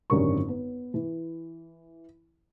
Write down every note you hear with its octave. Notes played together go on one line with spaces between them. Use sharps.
G#1 F#2 D3 G4 A#4 C#6
B3
E3